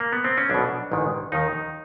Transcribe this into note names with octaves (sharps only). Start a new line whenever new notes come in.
A#3
B3
C4
C#4
B1 B2 D4
A1 G#2 D#3
D#2 D#3 D#4